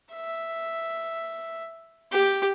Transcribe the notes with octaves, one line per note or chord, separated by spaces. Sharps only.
E5
G4